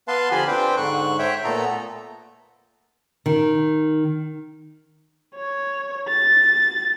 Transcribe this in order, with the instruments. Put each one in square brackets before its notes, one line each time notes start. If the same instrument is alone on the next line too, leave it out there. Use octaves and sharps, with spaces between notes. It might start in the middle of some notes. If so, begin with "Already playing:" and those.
[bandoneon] B3 B4 F5 A5 C6
D3 F3 F4 G4 G#5 B5
C4 D4 B4 C5 G5
G#2 D3 C#6 F#6
C5 C#5 E5 G5
A#2 A3 B3 A4 A#5
[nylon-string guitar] D#3
[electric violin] C#5
A6